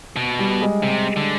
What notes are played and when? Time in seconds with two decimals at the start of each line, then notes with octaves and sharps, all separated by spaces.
0.16 B2
0.39 G3
0.61 G#3
0.83 C3
1.16 D3